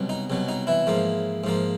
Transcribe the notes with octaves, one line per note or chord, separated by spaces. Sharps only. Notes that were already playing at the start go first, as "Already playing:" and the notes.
Already playing: C2 B2 F#3
D#4
C2 B2 F#3
D#4
E3 E4
G#2 F3 A#3
G#2 F3 A#3